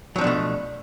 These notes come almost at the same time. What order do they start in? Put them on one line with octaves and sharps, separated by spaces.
F#3 F3 D4 B2 A3